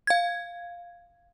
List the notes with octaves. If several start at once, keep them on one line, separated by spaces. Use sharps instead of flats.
F5 G#6